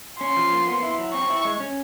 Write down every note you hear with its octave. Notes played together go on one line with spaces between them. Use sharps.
C#4 C6
F3
A#3
B3
E4
F#3
C4 C#6
E4
G#3
C#4